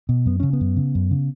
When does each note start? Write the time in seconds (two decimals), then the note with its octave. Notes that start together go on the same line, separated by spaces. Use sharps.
0.09 B2
0.26 F#2 B3
0.40 C#3 C#4
0.53 B3
0.61 F#2
0.77 C#3
0.95 F#2
1.11 C#3